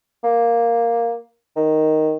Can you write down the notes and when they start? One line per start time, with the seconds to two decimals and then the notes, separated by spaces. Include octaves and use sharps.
0.24 A#3
1.56 D#3